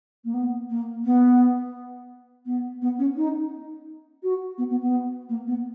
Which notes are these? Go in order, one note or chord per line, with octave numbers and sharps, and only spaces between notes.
A#3
B3
A#3
B3
B3
B3
C#4
D#4
F#4
B3
B3
B3
A#3
B3